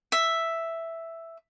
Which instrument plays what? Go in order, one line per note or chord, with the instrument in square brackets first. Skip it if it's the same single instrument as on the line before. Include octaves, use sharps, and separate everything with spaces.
[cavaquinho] E5